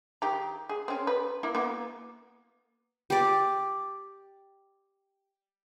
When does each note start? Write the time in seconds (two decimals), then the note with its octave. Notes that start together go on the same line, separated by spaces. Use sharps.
0.22 D#3 G4 A#5
0.69 G#4
0.88 C4 C#4
1.07 B4
1.43 A#3 E4 A#4
1.55 A#3 B3 F#4
3.10 G4 D5